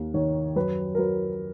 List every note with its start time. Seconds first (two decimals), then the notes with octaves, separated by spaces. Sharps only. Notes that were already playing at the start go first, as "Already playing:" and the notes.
Already playing: D#2
0.14 D#3 C#5
0.56 F#2 B4
0.95 A#4
0.98 F#3 B4